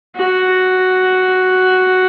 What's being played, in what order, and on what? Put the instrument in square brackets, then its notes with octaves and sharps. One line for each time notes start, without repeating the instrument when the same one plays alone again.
[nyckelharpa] F#4